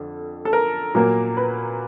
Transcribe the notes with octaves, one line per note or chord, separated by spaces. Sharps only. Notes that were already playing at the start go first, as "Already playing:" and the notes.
Already playing: F2 D3
A4
A#4
A#2 F#3 A#3
B4